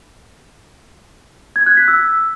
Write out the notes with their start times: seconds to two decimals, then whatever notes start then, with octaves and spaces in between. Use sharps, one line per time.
1.56 G#6
1.66 F#6
1.77 B6
1.88 E6